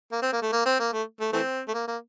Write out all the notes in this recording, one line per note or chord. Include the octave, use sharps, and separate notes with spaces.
A#3
C4
A#3
A3
A#3
C4
A#3
A3
A3
E3 A3 C4
A3
A#3
A#3